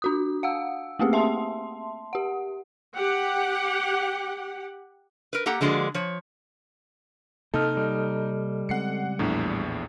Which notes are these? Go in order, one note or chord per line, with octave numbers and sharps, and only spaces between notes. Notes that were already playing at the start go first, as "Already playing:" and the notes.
D4 F#4 D#6
F5 F#5 E6
A3 A#3 C4 G4 G#4
E5 A5 C6
G4 F#5
G4 F#5
A#4 B4
A#3 G4 A4 F#5 A#5
D3 F3 G#3 A#3 F#4 D5
F3 C#5
C3 A#3 D#4 A4 D#5 F6
G3
C#3 G#3 C4 F#5 C7 C#7
A#1 E2 A2 D4